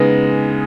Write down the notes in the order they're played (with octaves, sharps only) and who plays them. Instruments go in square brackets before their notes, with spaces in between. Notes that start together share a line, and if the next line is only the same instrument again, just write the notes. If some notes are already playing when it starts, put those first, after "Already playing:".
Already playing: [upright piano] C#3 G#3 B3 D#4